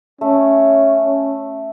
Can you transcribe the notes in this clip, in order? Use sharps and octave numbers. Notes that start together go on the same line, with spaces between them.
A3 C#4